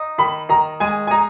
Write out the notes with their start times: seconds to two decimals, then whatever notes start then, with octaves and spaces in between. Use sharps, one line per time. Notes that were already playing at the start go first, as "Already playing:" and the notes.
Already playing: D#4
0.19 D#3 B5
0.49 D#3 A#5
0.80 G#3 G#5
1.07 G#5
1.11 D#4 A#5